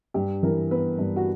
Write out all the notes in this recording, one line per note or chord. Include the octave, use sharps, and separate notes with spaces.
G2 G4
E3 A#4
B3 B4
G2
F#4